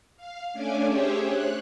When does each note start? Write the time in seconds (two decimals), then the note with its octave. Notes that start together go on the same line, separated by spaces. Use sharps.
0.17 F5
0.53 A3 C#4 D4 D5 G#5
0.86 G4 G#4 C5 C#5 E5
1.26 F#6